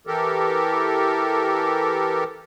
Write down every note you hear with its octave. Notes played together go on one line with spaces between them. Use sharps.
E3 G4 A4 A#4